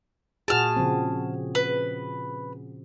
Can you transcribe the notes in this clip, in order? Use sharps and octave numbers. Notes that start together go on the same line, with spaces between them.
A#2 F#4 G#4 A5 F6
C#3 F3 C4
B4